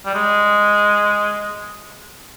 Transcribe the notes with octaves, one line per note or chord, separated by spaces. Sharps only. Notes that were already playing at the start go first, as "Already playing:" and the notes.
G3
G#3